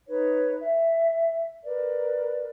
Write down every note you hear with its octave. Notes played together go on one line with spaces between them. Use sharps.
D#4 B4 C#5
E5
A#4 B4 D5